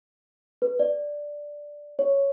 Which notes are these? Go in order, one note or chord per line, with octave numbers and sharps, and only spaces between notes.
B4
D5
C#5